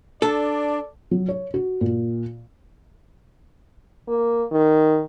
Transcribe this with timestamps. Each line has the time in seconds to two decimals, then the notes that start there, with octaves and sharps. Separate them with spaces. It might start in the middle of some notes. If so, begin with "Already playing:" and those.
0.22 D4 A4 D5
1.11 F#3
1.29 C#5
1.54 F#4
1.81 A#2
4.08 A#3
4.52 D#3